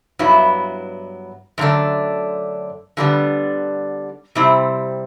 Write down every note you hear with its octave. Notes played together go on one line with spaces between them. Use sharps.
G2 F#3 B3 E4
F#2 D3 A3 D4
D3 G3 B3 D4
C3 G3 C4 E4